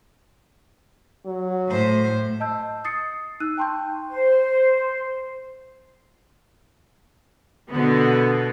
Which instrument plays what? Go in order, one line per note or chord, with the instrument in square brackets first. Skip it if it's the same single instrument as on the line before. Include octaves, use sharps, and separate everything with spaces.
[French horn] F#3
[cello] A2 C5
[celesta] D#5 A5 E6 G6
D#6 A6 C7 C#7
D#4 E6 F#6 D#7
G5 A5 C6 C#6 G6
[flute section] C5
[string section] B2 D3 B3